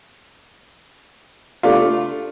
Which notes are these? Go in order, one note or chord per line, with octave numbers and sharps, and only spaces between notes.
A3 D4 F4